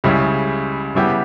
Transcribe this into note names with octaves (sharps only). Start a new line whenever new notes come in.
C#2 C#3 G3 C#4 E4
C#3 G3 B3 E4 G4